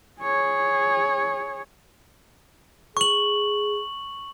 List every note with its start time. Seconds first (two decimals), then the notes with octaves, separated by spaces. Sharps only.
0.22 G#4 C#5
2.97 G#4 C#6 F#7